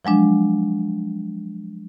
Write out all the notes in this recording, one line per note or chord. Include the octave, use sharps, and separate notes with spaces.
F3 F#3 G#3 D4